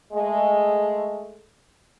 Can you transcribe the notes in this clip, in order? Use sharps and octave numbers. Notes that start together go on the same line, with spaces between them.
G#3 A3